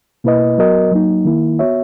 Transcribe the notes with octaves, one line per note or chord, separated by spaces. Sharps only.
B2 A#3 E4 B4 D#5
F#3 B3 F#4 A#4 D#5
F#3 A#3 D#4
D#3 A#3 E4
B3 F#4 C#5 E5